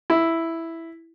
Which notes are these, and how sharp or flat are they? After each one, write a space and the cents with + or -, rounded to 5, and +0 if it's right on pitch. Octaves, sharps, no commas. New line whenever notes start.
E4 +0